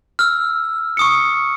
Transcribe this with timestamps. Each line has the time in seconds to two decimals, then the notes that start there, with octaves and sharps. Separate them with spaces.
0.19 E6 F6
0.97 C#6 D#6 C#7